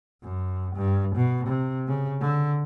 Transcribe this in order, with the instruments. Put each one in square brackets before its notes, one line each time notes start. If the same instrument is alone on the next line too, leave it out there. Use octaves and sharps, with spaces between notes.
[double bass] F#2
G2
B2
C3
C#3
D3